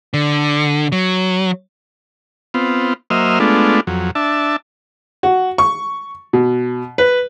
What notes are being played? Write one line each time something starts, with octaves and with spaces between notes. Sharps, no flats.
D3
F#3
B3 C4 F4
F#3 A#3 C5 D#5 E5 F6
G#3 A3 B3 D4 F4
F2 F#3
D4 E5 A5
F#4
C#6
B2
B4